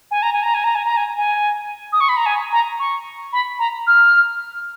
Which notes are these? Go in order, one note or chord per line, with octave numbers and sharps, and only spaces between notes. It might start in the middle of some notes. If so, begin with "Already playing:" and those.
G#5
A#5
G#5
A#5
G#5
A#5
G#5
A#5
G#5
G#5
D#6
C#6
B5
A#5
G#5
A#5
C#6
B5
A#5
F6